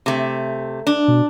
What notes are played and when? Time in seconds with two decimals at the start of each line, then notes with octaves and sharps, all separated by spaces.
0.06 C3 A3
0.87 D4
1.08 B2